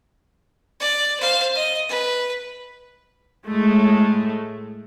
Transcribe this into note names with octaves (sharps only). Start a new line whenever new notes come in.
D5
C5 F5
D#5
B4
A2 G#3 A3